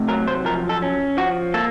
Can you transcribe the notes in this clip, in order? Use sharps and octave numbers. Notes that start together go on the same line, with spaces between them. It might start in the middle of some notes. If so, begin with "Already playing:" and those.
Already playing: C3 A3
F#3 A#4
C5
F3 A#4
A4
C#4
F3 F#4
A#3 A4